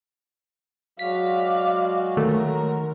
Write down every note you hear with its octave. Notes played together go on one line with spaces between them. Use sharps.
F#3 G#3 F#4 D5 F5 B6
D#3 A3 A#4